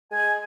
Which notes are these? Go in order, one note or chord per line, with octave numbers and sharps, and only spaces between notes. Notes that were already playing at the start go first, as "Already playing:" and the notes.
G#3 G#5